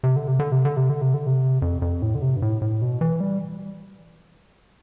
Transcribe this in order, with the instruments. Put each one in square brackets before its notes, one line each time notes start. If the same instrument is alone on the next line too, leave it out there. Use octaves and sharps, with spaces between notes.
[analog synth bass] C3
D3
C3
D3
C3
D3
C3
D3
C3
D3
C3
F2
F2
A2
D3
C3
G2
A2
A2
B2
E3
G3